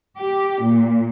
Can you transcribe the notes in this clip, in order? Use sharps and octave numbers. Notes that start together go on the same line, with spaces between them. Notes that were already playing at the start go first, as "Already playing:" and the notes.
G4
A#2